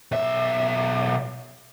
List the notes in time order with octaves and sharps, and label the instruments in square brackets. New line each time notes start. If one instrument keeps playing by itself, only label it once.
[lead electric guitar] B1 E5